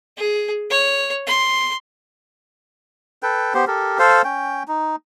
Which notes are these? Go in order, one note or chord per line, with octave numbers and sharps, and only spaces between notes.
G#4
C#5
C6
A4 B4 G5
B3 G4 C5
G4 A4 A#4
A4 C5 F5
C#4 G5
D#4